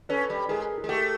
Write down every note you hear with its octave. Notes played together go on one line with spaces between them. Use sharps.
C#4 A4 B4
G3
G#3 G#4 A#4
G#4
G#3
A3 G4 A4